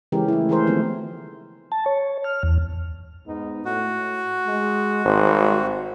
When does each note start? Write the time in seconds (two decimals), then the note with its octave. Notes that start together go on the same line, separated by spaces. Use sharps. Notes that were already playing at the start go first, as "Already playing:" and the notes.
0.12 C#3 E3 G#3 C#4 G4 A#4
0.28 A3 E4
0.49 E3 A3 G#4 A#4 C5
0.67 D#3 F3 G#3 A3 B3 C4
1.72 A5
1.86 C#5
2.24 F6
2.43 E2
3.26 G#2 B3 D#4
3.65 A2 F#4
4.46 G#3
5.05 G#1 G3 C5